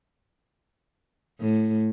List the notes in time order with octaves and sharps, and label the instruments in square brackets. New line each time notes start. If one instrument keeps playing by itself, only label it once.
[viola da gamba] A2